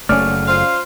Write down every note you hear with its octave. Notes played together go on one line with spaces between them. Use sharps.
F#1 A3 C#4 D5 F6
F4 C5 F5